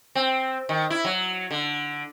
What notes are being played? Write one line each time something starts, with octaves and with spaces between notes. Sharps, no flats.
C4
D#3
E4
F#3
D3